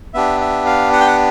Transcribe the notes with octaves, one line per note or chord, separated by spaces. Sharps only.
B3 D4 G4 E5
E5
F5
F#5
G5
F#5